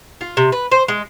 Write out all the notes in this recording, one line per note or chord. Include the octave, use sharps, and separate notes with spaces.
F4
C3
B4
C5
G#3